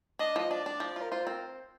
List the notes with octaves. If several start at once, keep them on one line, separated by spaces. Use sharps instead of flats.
D4 D#5
F3 D#5
D4 D5
D4
F3
F4
A#4
F4 C5
C4 A#4